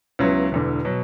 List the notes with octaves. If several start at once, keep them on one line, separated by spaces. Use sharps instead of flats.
C#2 C#3 F#3 B3 E4
E1 E2 D3
B2 F#3